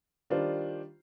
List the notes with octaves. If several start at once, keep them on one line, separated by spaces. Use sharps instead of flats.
D#3 G3 D4 F4 C5